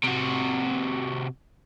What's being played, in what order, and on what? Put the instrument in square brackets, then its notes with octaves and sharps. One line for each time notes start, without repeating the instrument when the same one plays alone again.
[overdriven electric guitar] C3 F#4